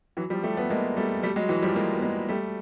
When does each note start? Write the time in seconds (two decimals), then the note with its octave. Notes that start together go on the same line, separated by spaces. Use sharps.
0.17 E3 F#3
0.30 F3 G3
0.43 G3 A3
0.57 A3 B3
0.70 G#3 A#3
0.97 G3 A3
1.23 G3 A3
1.36 F#3 G#3
1.49 E3 F#3
1.62 F3 G3
1.76 G#3 A#3
1.95 B3
2.02 G#3 A#3
2.28 G3 A3